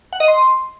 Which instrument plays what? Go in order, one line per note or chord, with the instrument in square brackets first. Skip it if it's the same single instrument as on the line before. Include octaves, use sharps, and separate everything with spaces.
[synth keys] F#5
D#5
C6